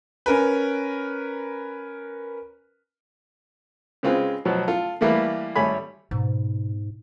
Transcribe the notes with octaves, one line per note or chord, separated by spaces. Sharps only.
C#4 A#4 B4
C#3 G#3 C4 F4 B4
B2 F3 F#3
F4 A4
E3 G3 A3 A#3 E4 B4
G#1 G3 A3 C#5 G#5 B5
G#2 B2